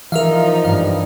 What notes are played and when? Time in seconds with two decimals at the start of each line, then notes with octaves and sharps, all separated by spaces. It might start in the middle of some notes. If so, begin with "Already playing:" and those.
0.12 E3 F3 D#4 A#4 E5 F5
0.65 G2 F5